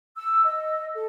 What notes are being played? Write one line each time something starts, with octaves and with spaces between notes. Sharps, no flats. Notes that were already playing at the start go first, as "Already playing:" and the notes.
E6
D#5
A4